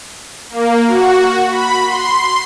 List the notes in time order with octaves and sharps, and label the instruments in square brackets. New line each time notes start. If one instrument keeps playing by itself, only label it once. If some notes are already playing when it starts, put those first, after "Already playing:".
[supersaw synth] A#3
F#4
B5
C6